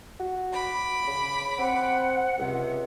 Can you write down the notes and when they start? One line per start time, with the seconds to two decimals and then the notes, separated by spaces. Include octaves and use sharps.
0.20 F#4
0.53 B5 D6
1.07 C#3
1.59 C4 F#5
2.38 C#2 C3